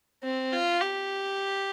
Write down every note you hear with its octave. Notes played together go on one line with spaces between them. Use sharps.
C4
F4
G4